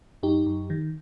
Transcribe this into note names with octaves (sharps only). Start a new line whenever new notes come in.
F#2 D#4 G4
F#2
D#3